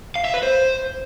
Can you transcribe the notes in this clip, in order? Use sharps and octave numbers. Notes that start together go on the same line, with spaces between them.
F5
E5
B4
C5